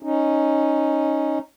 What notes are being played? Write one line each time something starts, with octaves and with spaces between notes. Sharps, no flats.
C#4 D#4